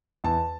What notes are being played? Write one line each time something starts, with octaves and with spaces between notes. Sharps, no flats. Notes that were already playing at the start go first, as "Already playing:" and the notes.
E2 A5